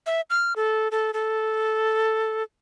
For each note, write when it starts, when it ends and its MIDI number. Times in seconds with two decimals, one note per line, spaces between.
0.06 0.21 76
0.30 0.53 89
0.56 0.88 69
0.92 1.11 69
1.14 2.43 69